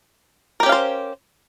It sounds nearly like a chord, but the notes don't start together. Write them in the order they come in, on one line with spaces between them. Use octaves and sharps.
A#4 G4 C#4 F5 C5